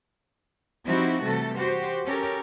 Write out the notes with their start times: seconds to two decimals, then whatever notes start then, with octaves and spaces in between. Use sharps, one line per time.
0.84 F3 C4 D#4 E4 F#4 G4
1.24 C3 E3 G3 A3 A4
1.57 F#4 G4 C5
2.05 C#4 G4 A4 A#4